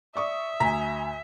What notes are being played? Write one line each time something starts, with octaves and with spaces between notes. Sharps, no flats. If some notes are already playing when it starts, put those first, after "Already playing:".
D5 E5 C#6 D#6
D2 G#5 A#5 B6